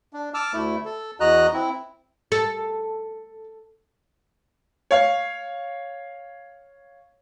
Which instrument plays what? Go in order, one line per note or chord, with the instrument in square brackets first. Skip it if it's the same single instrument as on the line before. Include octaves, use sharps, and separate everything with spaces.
[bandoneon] D4
A5 D6 E6 F6
D2 A3 E4
A4
E2 F#4 D#5 A#5 F#6
C4 E4
[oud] A4
[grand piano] C#5 F5